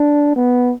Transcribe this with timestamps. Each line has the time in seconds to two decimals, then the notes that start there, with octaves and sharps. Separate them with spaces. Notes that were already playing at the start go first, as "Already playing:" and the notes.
Already playing: D4
0.36 B3